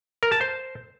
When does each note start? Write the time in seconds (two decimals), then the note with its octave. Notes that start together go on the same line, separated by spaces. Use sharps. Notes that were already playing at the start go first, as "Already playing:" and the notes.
0.23 A#4
0.32 A5
0.41 C5